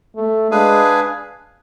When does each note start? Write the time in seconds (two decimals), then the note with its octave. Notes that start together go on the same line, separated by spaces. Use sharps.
0.16 A3
0.51 G#3 D4 G#4 B4 F5 G#5